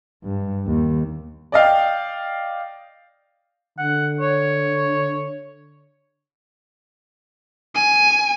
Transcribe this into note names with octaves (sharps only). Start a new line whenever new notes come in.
G2
D#2
D5 D#5 F5 G5
D3 F#5
C#5
G#5